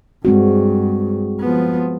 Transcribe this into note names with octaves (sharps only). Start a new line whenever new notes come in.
G2 G#3 C4 F#4
F3 B3